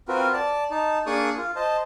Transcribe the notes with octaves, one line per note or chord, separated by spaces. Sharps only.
C4 F4 F#4 A#4 B4
D5 A5
D#4 A5
A#3 D4 G#4 D5 C#6 D#6
F4
C5 D#5 A5